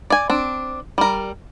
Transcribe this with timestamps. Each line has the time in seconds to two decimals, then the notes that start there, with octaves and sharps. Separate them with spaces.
0.10 D5 G#5
0.30 C4 D4
0.98 G3 A#4